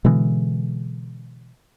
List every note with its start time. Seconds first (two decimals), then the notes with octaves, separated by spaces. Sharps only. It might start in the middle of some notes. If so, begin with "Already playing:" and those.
0.05 B2 D3 E3 G#3